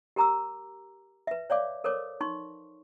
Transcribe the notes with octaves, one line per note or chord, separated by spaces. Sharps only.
G4 A#4 A#5 D6 E6
B4 E5
C#5 D5 F5 D6
A4 A#4 C5 C#5 D6
D#4 C6 C#6